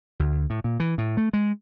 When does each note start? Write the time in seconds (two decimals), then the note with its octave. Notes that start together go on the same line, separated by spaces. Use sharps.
0.19 D2
0.50 A2
0.64 A#2
0.80 E3
0.98 A2
1.17 A3
1.33 G#3